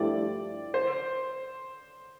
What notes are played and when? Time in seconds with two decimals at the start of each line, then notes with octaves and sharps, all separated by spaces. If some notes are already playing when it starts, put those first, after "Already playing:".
Already playing: G2 F3 A3 E4 G4 D5
0.74 C5